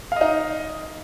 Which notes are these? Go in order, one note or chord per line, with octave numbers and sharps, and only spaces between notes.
D#4 D#5 F5